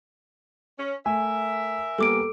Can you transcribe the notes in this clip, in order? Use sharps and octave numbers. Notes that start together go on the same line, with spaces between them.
C#4
A3 A#4 E5 G#5
G3 A#3 B3 A4 D6 D7